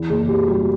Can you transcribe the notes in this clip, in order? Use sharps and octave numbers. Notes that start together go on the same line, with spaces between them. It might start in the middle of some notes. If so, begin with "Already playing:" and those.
Already playing: E2
F#1 G#4
B2 G4
G3 F#4